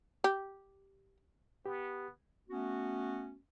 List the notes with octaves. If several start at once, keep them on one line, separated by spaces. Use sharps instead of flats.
G4
B3 G4
A3 B3 C#4 F#4